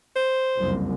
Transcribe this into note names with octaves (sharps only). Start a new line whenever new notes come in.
C5
F#1 C2 F2